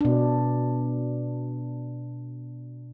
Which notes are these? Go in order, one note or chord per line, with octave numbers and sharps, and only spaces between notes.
B2 D4